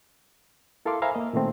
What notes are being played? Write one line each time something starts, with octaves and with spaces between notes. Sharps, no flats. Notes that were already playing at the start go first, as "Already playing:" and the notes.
E4 A4 A#4 F5 C6 D6
C5 E5 F5 G#5 A#5 B5
A#3 D#5
A#2 D#3 A3 C4